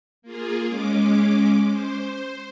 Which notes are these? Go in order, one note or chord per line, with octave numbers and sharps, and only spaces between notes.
A#3 F4 G#4
G#3 C#4 D6
C5